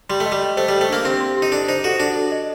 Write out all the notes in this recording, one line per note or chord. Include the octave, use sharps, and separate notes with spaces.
G3 C6
A3
D#5
G3
D#5
A3 C5
G3 A4
A3
A#3 D4
C4 G4
C6
G4
D#4
D4 A4
D#4 C5
F#4 A4
D4 A4
A4
D#5